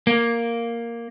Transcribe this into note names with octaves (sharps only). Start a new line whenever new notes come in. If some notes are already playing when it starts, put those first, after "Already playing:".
A#3